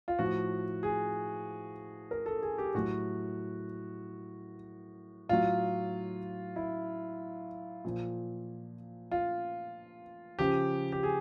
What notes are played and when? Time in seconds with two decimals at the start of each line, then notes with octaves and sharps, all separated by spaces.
0.08 F4
0.19 A2 F3 F#4
0.83 G#4
2.11 A#4
2.26 A4
2.42 G#4
2.58 G4
2.75 A2 F#3 F#4
5.29 A2 F#3 F4
6.56 E4
7.85 A#2 F3
9.11 F4
10.39 C#3 F3 G4
10.92 G4
11.03 G#4